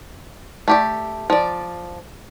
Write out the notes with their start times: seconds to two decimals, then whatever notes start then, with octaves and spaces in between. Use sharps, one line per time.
0.68 A3 G4 D5
1.30 F3 D5